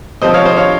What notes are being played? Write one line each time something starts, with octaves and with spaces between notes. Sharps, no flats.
C3 F3 C4 C5 D#5
C#5 F5
C5 D#5
C#5 F5